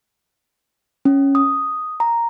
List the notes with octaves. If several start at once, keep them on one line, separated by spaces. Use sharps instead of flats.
C#4
D#6
A#5